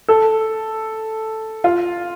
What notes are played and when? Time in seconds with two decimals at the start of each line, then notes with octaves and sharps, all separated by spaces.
0.08 A4
1.64 F4